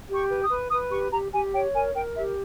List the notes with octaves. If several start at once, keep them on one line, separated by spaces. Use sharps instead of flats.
G4
C#6
B4
D#6
B4
B4 D#6
G4 C#6
G4 A#5
G4 G#5
C#5 G5
A#4 G#5
A#4 G5
G4 E5